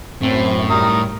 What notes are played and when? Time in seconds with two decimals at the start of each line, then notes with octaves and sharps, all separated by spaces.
0.22 F#2 A2 C4
0.70 G3 A#4 D#6